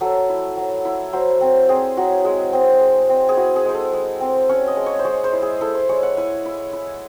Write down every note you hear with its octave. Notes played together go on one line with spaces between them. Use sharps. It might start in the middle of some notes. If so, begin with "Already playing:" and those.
F#3 A4
E4
F#3
E4
F#3 C5
C4
C4 G#4
F#3 F#4
G#3 G#4
C4
G#3
C4
G#4
E4 F#4
G#4
G#3 C5
A4
G#3
C4
C#4 C#5
D#5
G#3
C#5
C5
G#3 C#5
C5
E4
G#4
E4 A4
C5
G#3 C#5
F#5
E4 G#5
E4
E4